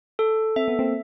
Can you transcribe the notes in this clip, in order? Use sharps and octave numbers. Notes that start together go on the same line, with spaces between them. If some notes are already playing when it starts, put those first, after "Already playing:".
A4
C4 E5
B3
A#3 C4